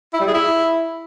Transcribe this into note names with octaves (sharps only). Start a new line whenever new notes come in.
E4
G3
G#4
E4